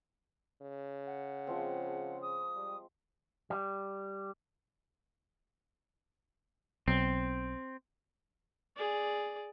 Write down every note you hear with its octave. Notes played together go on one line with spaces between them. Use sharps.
C#3
F#5
F3 G#3 C4
D#6
G3
G3
B1 C4
G#4 D5